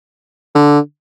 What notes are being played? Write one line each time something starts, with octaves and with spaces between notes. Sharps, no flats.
D3